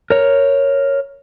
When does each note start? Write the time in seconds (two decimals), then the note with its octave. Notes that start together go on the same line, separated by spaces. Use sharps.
0.10 A#4 C#5